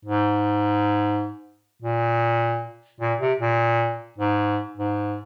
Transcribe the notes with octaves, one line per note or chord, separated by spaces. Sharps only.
G#2
A#2
A#2
C3
A#2
G#2
G#2